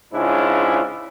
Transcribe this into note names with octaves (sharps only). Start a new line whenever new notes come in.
G#2 C#3 D4 E4 F4